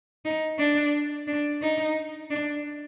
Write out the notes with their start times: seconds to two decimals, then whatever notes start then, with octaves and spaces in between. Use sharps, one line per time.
0.25 D#4
0.59 D4
1.28 D4
1.62 D#4
2.31 D4